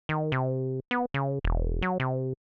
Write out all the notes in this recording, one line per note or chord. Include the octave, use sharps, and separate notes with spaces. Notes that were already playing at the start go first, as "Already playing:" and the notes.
D#3
C3
B3
C#3
E1
F#3
C3